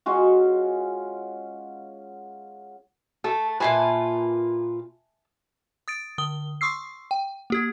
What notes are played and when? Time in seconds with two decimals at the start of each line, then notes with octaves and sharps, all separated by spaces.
0.06 G#3 C#4 F4 F#4
3.24 A3 A4
3.60 A#2 F4 B4 E5 G#5 A5
5.88 D#6 A6 D7
6.18 D3 D#6 G7
6.61 C6 C#6 D#6 E6 C7
7.11 G5
7.50 A#3 G4 G#6